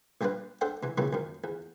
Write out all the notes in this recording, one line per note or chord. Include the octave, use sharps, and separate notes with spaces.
A#1 G3 D4 F4 B4
D4 A4 C5 F#5 G5
C3 E3
B1 G2 A#2 C#3 E3 B3
F#2 D#3
E2